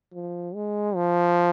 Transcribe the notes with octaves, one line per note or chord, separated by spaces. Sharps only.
F3
G#3
F3